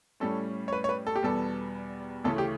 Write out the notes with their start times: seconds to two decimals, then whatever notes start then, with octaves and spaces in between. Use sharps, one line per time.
0.20 A2 G3 C#4 A4
0.68 C#5
0.73 B4
0.84 C#5
0.89 B4
1.07 A4
1.16 G4
1.23 E2 B2 G3 B3 A4
2.24 D2 C#3 E3 A3 C#4 A4
2.38 G4